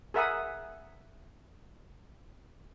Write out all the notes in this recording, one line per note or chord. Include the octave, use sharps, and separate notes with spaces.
G#4 A#4 E5 F#5 B5 D#6